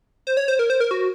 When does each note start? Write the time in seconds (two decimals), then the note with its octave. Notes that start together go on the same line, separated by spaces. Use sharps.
0.27 C5
0.37 C#5
0.48 C5
0.59 A#4
0.70 C5
0.80 A#4
0.91 F#4